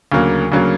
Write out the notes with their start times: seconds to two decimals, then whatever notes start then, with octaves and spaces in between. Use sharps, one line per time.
0.12 D2 C#3 F#3 A#3
0.52 D2 C#3 F#3 A#3